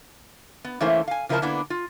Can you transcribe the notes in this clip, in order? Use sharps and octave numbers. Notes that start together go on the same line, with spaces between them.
B3
E3 A3 A#3 C#4 E4 C5
F5 G#5
C#3 F3 E4 A#4 C5 A5
D3 A#3 B3 D4 E4
F4